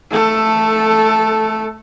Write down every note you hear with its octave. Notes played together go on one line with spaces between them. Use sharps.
A3 A4